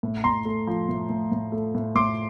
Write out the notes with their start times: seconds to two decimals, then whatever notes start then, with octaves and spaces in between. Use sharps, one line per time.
0.03 A2
0.24 A2 A#5 C6
0.45 A3
0.67 F3
0.89 A2
1.09 A2
1.32 A2
1.52 A3
1.75 A2
1.95 A2 C6 D6